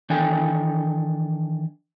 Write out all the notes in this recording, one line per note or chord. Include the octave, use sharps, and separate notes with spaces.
D#3 E3 D4 A4 G5 G#5